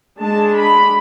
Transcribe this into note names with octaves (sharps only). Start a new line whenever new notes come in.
G#3 D4 A5
B5